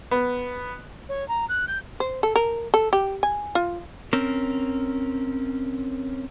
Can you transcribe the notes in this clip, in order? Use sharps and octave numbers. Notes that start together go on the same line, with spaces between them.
B3
C#5
A#5
F#6
G6
C5
A4
A#4
A4
G4
G#5
F4
C4 C#4 A#4